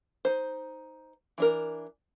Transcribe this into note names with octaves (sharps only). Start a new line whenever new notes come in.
D#4 C5
E3 D4 A#4